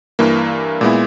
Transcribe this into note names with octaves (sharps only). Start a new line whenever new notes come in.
G2 E3 A#3
A#2 G#3 B3 E4